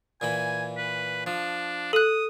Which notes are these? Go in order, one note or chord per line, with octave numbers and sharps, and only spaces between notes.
A#2 E3 G#5 B5
B4
F3 D4
A4 D#6 F#6